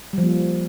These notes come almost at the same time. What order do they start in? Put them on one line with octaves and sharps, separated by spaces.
G3 F3 A#3